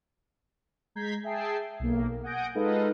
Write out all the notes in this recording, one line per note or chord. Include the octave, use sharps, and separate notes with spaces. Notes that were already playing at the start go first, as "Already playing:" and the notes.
G#3 A#5 G6 G#6 B6 C7
G#4 E5 G5 A5 C7
B1 A#3
F#5 G#5 D#6 G6 A#6 D7
G#3 D#4 F4 A4 B4 D#5